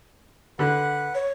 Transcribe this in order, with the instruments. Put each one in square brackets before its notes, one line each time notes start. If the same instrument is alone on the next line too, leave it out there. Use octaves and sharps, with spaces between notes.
[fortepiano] D3 [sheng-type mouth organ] B4 F#5
[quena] C#5